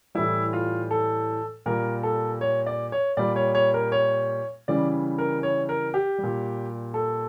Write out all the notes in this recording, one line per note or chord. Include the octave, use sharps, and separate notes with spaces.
A2 E3 G3 E4
F4
A4
A#2 G3 A#4
A4
C#5
D5
C#5
A#2 G3 D5
C#5
C#5
A#4
C#5
C#3 E3 G3 D5
A#4
C#5
A#4
G4
A#2 G3
A4